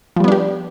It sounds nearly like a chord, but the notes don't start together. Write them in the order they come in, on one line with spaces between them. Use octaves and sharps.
F3 G3 B3 D4 G4